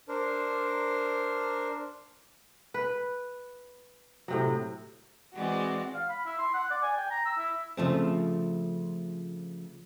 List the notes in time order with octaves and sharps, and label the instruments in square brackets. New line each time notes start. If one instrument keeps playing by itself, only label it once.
[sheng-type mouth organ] D4 A#4 C5
[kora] B4
A2 C3 F#3
[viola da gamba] E3 G#3 C4 [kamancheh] F#4 D5
[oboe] F5
B5
E4
C6
F#5
D5
G#5
G5
A#5
E6
E4
[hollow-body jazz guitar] C#3 F3 A3 C4